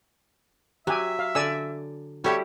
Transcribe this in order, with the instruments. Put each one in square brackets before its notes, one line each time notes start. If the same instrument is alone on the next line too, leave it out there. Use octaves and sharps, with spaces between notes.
[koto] F#3 [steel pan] G4 G#5 [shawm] E5
[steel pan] F5
[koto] D3 [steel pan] D5 G#5 E6
[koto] G3 E4 G4 [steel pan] F#4 A4 [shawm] C#5